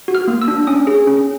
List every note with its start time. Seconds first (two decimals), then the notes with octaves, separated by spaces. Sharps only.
0.08 F#4
0.15 F6
0.28 A#3
0.42 E6
0.48 D4
0.67 C#4 D#6
0.87 G#4
1.07 C#4